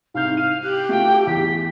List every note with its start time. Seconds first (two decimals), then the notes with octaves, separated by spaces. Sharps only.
0.14 C2 G#2 F5 G6
0.37 F5 D#7
0.63 G4 F#6
0.89 A3 F4 F#4 G5
1.27 E2 B6